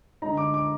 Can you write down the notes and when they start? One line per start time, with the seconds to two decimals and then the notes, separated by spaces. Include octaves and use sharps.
0.22 D3 G#3 D#4 A#5
0.37 D6
0.54 D6